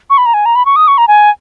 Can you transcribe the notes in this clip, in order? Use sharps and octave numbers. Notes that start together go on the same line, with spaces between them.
C#6
B5
A#5
G#5
A#5
B5
C#6
D#6
C#6
A#5
G#5